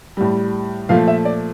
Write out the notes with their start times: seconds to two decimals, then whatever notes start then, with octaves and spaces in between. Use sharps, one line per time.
0.17 A2 G3
0.89 A#2 F3 A3 F5
1.08 E5
1.25 D5